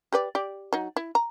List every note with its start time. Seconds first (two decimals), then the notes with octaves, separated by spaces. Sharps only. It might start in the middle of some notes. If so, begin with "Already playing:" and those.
0.12 G4 B4 D5
0.35 G4 D5
0.73 F#3 D#4
0.96 E4
1.15 A#5